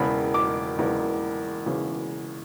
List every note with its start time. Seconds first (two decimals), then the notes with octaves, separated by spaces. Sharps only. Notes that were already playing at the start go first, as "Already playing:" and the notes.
Already playing: E1 E2 C#3 B5
0.34 D6
0.78 E1 E2 C#3
1.66 E1 E2 C#3